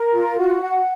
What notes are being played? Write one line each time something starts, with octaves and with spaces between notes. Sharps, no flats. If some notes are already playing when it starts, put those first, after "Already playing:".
Already playing: A#4
F4
F#4
F#5